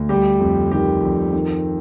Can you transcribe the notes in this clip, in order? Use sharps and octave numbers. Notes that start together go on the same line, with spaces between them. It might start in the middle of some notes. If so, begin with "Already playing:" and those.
Already playing: D2
G3 G4
F2
D#3 G4
F2
D#3